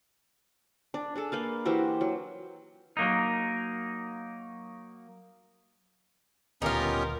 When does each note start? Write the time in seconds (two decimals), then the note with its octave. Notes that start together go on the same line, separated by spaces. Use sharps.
0.94 D4
1.15 D4 G#4 A4
1.32 A#3 B4 F5
1.65 E3 F#4 G4 C5
2.01 F#3
2.97 F#3 A#3 D#4
6.62 D#1 D2 B3 C#4 D#4 F4 G4 A#4